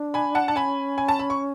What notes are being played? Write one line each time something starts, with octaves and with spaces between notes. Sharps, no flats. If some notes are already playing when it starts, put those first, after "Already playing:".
Already playing: D4
G#5 B5
F#5 A5
A5
C#4 G#5 B5
G#5
A5
B5
C#6